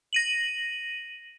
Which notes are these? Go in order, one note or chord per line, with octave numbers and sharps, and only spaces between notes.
A#6 D#7 F#7